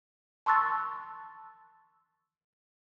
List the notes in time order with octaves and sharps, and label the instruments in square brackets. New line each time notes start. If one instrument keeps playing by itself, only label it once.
[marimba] A5 C6 C#6 E6 F#6 A6